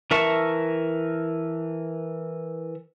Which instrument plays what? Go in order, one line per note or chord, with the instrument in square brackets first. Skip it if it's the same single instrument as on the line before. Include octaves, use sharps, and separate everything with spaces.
[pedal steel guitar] E3 A#4 E5 A5 C#6